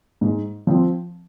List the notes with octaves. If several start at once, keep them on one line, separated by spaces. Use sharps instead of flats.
G#2
F3 C4